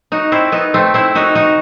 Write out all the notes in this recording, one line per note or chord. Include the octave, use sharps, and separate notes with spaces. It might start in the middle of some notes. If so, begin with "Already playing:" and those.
D#4 F#4
C4 E4
B3 D#4
A3 C4
C4 E4
D#4 F#4
D#4 F#4